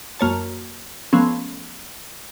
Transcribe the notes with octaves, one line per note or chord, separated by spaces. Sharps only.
F#2 A#3 C#5 A5
F3 A3 B3 C#4